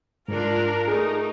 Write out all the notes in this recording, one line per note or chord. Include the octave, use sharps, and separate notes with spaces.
G#2 D4 F4 A#4 D5
A3 D#4 G#4